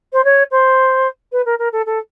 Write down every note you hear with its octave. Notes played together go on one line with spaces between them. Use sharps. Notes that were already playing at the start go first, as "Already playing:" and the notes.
C5
C#5
C5
B4
A#4
A#4
A4
A4